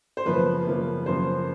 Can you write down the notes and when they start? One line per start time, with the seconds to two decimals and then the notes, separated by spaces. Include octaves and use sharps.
0.17 C5
0.26 F#2 C#3 F3 A#3 B4
0.66 F#2 C#3 F3 A#3
1.06 F#2 C#3 F3 A#3 C5